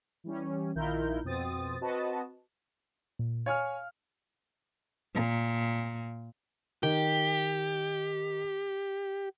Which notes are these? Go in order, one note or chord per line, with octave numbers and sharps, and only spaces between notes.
E3 G3 C#4
A#1 D#3 E4 F4 A#4 G6
F2 B2 C4 D#6 A6
C4 F#4 B4 D#5 A5
A#2
C#5 F5 G#5 F6
A#2
D#3 G4